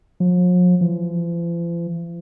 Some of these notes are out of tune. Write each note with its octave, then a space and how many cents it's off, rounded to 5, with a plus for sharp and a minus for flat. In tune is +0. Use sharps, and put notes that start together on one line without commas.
F3 +45
F3 -45